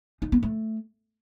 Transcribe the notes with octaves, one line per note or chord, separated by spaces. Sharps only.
D#4
B3
A3